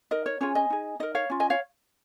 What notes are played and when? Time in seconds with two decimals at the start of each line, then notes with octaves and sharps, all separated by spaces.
0.11 D#4 A#4 D#5
0.26 C#5
0.41 C#4 F4 G#4 C#5
0.55 D#5 G#5
0.70 D#4 G#4
1.00 D#4 A#4 D#5
1.15 C#5 F5
1.30 C#4 F4
1.40 D#5 G#5
1.50 C#5 F5